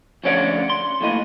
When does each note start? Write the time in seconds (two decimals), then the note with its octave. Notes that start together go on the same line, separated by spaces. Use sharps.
0.24 D2 F3 C#4 C#5 D5 F#5
0.70 C6
1.01 D#2 A2 D#5